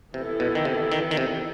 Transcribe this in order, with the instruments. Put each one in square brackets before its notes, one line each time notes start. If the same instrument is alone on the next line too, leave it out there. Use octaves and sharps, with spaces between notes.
[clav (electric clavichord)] C3 [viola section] E3 B3 E4 A4
[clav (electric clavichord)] B2
D#3
C3
D#3
D#3
C3